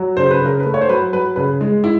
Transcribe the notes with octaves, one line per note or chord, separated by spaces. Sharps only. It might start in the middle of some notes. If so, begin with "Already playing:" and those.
Already playing: F#3
C#3 C5
B4
C#3 A#4
B4
A3
C#5
C5
F#3 B4
F#3 B4
C#3 B4
G#3
E4